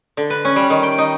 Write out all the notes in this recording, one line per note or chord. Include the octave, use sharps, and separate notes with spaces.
D3
B4
C#4
G3
D#3
G5
D#4